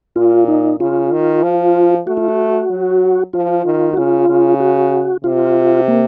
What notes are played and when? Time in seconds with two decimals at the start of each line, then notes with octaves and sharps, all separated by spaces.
0.16 A#2 F4
0.48 D#4
0.80 C#3 F4
1.11 D#3
1.43 F3
2.07 A3 F#4
2.17 F4
2.29 F#4
2.70 F#3
3.33 F3 F4
3.65 D#3
3.93 F#4
3.97 C#3 F4
4.29 C#3
4.60 F#4
5.24 C3 F4
5.88 A#3